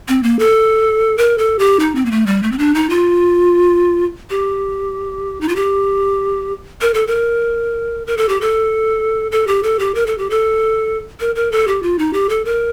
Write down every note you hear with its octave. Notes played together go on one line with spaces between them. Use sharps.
C4
A#3
A4
A#4
A4
G4
D#4
C4
A#3
A3
G3
A3
C4
D4
D#4
F4
G4
D#4
F4
G4
A#4
A4
A#4
A#4
A4
G4
A4
A4
G4
A4
G4
A#4
A4
G4
A4
A#4
A#4
A4
G4
F4
D#4
G4
A4
A#4